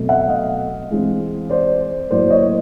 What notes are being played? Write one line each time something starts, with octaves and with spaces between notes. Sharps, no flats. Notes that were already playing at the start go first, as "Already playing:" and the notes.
Already playing: B2 F#3 A3 C4
E5 F#5
D#5 F5
E3 G#3 C4
C5 D5
A2 F#3 A#3 C5 D5
C#5 D#5